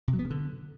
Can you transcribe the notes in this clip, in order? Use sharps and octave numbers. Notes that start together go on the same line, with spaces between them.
C3
F#3
B3
C#3
D3